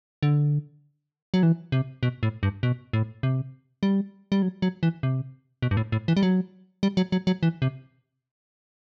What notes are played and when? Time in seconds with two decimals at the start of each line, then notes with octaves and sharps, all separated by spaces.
0.23 D3
1.34 F#3
1.43 E3
1.72 C3
2.03 B2
2.23 A2
2.43 G2
2.63 B2
2.93 A2
3.23 C3
3.83 G3
4.32 G3
4.42 F#3
4.62 F#3
4.83 E3
5.03 C3
5.62 B2
5.71 G2
5.77 A2
5.92 A2
6.08 E3
6.17 G3
6.23 F#3
6.83 G3
6.97 F#3
7.12 F#3
7.27 F#3
7.43 E3
7.62 C3